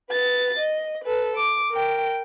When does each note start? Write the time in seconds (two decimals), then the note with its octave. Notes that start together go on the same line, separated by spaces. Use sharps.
0.10 B4 A6
0.59 D#5
1.04 A4 B4
1.36 D6
1.71 A#4 G5